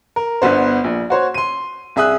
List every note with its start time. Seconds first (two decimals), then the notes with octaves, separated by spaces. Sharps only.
0.16 A#4
0.42 G1 D3 B3 C5
0.84 A#1
1.10 F#4 C5 C#5
1.34 C6 D#7
1.96 C2 G#4 E5 D#6 F#6